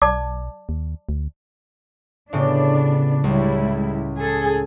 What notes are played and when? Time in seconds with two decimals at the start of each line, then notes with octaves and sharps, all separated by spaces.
0.02 B1 D5 A5 D6
0.69 D#2
1.09 D2
2.33 A2 C#3 B3 D4 G4
3.24 C#2 G3 G#3 E4
4.19 G#4 A4